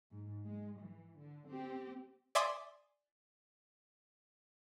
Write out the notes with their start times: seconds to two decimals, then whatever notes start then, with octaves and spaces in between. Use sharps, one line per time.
0.12 G#2
0.45 G#3
0.80 E3
1.18 D3
1.48 C4 G4
2.35 D5 E5 G#5 C6 D6 D#6